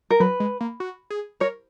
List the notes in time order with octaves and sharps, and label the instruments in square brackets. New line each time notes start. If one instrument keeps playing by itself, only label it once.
[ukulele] A#4
[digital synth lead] F#3 [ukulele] B4
[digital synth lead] G#3
A#3
F#4
G#4
[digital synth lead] A#4 [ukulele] C#5